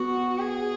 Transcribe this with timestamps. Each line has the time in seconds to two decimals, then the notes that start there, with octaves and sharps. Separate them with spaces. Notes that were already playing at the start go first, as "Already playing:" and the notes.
Already playing: B3 F#4
0.39 G#4